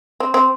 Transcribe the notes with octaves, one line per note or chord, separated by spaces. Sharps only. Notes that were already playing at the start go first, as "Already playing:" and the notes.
C4
C4